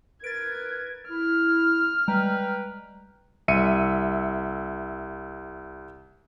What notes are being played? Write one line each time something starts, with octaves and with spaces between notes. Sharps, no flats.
A#4 B4 G#6 A6 D7
E4 F6
G3 G#3 B4 G5 A#5
C2 E5 C#7 D#7